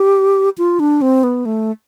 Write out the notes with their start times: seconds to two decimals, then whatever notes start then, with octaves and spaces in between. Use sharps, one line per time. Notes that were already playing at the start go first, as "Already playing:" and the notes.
Already playing: G4
0.58 F4
0.80 D4
1.02 C4
1.24 B3
1.45 A3